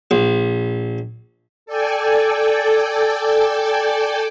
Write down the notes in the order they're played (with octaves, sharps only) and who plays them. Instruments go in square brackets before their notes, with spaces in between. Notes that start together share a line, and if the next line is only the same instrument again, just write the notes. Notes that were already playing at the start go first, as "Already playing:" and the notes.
[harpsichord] A#1
[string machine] A4 D5 G5 G#5